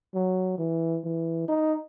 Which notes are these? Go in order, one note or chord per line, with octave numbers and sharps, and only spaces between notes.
F#3
E3
E3
D#4